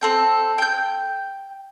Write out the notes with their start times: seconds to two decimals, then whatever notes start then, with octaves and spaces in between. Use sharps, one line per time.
0.01 C4 A4 G5
0.58 G5 G6